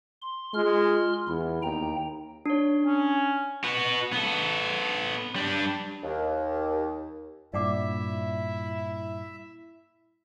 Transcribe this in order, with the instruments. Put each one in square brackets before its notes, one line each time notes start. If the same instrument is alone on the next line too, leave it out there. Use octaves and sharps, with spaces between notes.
[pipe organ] C6
[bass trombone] G#3 [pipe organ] F4 C6 F6
[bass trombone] E2 [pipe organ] E4
[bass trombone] D#2 [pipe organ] G5 A#5
[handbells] D4 C#5
[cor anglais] C#4
[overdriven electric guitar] F#4 B4
B3 A4
G3 D4
[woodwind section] D#2
[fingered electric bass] G2 A#2 [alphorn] E4 [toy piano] D5 F#5 D6 [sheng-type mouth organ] E5